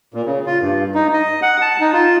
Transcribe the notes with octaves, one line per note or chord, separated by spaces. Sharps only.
A#2
C#3
F4
G2
D#4
D#5
F#5
A5
D#4
F4